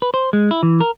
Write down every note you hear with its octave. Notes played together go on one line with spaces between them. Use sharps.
B4
C5
G#3
E4
E3
A#4